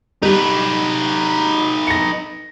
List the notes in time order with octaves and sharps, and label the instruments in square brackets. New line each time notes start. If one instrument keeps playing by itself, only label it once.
[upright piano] G3 [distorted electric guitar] D#4 B4
[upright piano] A#6 C#7